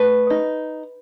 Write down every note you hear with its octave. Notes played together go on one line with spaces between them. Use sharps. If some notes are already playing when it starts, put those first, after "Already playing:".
Already playing: A3 B4
D#4